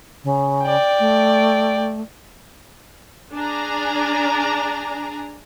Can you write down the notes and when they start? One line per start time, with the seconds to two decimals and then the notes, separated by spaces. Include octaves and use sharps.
0.24 C#3
0.64 D5 G5
0.99 A3
3.34 D4 G#4 G#5 A#5